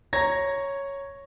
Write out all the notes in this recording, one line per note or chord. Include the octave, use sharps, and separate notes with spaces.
C#5 A#5 G#6 A#6